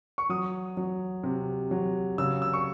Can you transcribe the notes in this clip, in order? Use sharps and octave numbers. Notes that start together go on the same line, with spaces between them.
C#6
F#3 D#6
F#3
C3
F#3
C#3 E6
E6
C#6